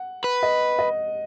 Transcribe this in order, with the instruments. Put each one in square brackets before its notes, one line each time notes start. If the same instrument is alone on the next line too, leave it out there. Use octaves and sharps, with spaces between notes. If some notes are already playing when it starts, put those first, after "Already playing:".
Already playing: [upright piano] F#5
[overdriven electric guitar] B4
[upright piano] D#5
D#5